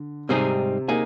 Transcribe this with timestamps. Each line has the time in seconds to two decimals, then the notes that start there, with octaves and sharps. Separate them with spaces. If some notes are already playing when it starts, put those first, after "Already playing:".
Already playing: D3
0.29 G#2 C3 G3 C4 D#4 G#4
0.88 A#3 D#4 G#4